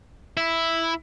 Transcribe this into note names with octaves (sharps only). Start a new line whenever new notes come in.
E4